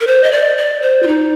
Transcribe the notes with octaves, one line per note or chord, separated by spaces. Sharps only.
A#4
C5
D#5
D5
D5
C5
F4
D#4